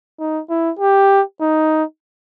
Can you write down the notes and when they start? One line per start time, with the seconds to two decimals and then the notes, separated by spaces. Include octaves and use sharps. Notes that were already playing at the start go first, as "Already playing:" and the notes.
0.20 D#4
0.49 E4
0.79 G4
1.41 D#4